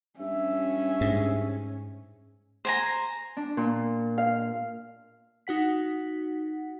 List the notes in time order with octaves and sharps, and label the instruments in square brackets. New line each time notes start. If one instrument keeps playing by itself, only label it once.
[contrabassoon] G2 [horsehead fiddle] C#4 [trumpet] E5
[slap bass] G#2
[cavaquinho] C5 G#5 A#5
[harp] D4
A#2
F5
[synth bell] D#4 F#4 F#5 B6